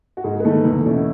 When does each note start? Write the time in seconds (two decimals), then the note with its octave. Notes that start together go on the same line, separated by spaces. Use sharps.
0.17 F#4
0.24 G#2 G#4
0.40 B4
0.44 D#3 A3 D#4 A4
0.65 E2
0.85 B2 A3 C#4 E4